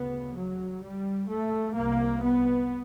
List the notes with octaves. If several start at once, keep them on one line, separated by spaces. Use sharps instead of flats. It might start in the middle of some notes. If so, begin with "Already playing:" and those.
Already playing: D2 C#3 B3
F#3
G3
A3
C2 C3 A#3
B3